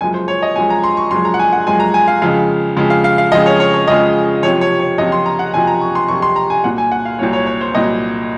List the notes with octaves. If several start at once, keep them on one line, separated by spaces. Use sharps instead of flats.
F#1 F#2 F3 G#3 G#5
C5
C#5
D#5
F#1 F#2 F3 G#3 G#5
A#5
C6
C#6
F#1 F#2 F3 G#3 C6
A#5
F#5
G#5
F#5
F#1 F#2 F3 G#3 G#5
A#5
G#5
F5
F2 C#3 F3 G#3 F5
F2 C#3 F3 G#3
F5
F5
F5
F2 C#3 F3 G#3 D#5
C#5
C#5
C#5
F2 C#3 F3 G#3 D#5
F#1 F2 C3 F3 C#5
C#5
C#5
F#1 F2 C3 F3 D#5
C6
A#5
F#5
F#1 F2 C3 F3 G#5
A#5
C#6
C6
F#1 F2 C3 F3 C#6
C6
A#5
G#5
C2 A#2 F#3 F#5
G#5
F#5
F5
C2 A#2 F#3 C#5
C#5
C#5
C5
C2 A#2 F#3 D#5